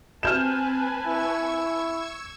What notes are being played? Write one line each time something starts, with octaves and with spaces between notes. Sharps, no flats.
C4 B4 G#5 A5 F6 G6 E7
E4 C#6 E6 G#6